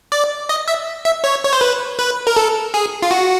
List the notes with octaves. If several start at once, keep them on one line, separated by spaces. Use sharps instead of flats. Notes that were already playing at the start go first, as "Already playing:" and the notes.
D5
D#5
E5
E5
C#5
C#5
C5
B4
B4
A#4
A4
G#4
F4
F#4